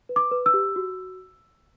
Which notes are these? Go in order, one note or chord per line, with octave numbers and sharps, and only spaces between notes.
B4
D6
B4
E6
G4
F#4